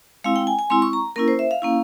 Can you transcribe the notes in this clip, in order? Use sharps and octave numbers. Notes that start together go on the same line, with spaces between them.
G#3 C4 E4 F5
G5
G#5
G#5
G#3 C4 E4 C6
C#6
A#5
A#3 C#4 E4 A#4
C5
E5
F5
A#3 C#4 E4